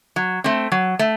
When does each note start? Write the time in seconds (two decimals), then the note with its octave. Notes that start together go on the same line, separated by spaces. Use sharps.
0.16 F#3
0.44 A3 C4
0.72 F#3
0.99 A3